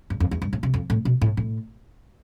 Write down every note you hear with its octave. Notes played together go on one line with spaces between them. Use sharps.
G2
F2
E2
G2
A2
C3
F2
A2
B2
A2
A2